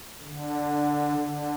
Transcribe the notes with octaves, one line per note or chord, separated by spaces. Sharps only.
D3
D3